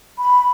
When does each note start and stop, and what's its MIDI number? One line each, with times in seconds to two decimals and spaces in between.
0.18 0.51 83